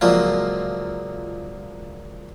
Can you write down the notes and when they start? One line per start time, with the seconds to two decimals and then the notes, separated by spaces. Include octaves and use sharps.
0.01 C#2 A#2 F3 F#3 A#3